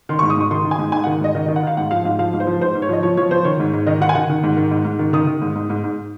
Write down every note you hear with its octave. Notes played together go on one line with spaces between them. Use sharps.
D#3 C6
G#2 C#6
D#6
G#2 C#6
D#3 C6
D#3
G#5
G#2
G#2 G#5
D#3 F#5
G#2 D#5
D#3 D#5
D#3 D#5
F#5
D#3 F5
G#2 F#5
F3 F5
G#2 F5
F3 F5
G#2
C5
F3
G#2 C5
G#2
C#5
F3 D#5
F3 C#5
F3 C#5
F3 C5
D#3 C#5
G#2
G#2
D#3 D#5
D#3 F#5
G#5
D#3 F#5
D#3
G#2
D#3
G#2
G#2
D#3
D#3 D#6
D#3
G#2
G#2
G#2
G#2